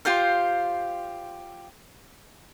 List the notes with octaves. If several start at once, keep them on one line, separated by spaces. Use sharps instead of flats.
F4 G4 C5 F5